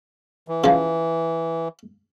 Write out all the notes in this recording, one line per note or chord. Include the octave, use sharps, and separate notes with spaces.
E3
C#3 F3